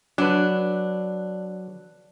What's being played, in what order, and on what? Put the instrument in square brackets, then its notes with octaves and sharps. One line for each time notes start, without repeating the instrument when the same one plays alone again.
[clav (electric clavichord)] F#3 B4 [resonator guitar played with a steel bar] D4 [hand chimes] F#6